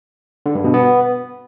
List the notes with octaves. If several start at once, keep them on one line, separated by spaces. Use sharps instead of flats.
D3
G2
B2
B3